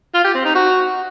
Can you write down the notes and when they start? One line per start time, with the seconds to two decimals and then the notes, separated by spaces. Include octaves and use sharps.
0.14 F4
0.24 G4
0.35 C4
0.45 D#4
0.55 F#4